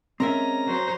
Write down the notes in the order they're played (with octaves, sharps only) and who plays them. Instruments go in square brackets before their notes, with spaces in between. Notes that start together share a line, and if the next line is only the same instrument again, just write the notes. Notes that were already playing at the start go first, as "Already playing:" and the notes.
[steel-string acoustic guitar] G#3 C#4 [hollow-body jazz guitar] C4 A#4 E5 [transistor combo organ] A#5
[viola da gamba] F#3 C5